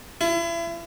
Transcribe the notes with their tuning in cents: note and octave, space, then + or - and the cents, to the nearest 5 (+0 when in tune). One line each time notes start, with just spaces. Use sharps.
E4 +35